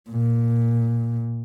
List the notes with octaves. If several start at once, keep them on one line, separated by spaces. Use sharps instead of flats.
A#2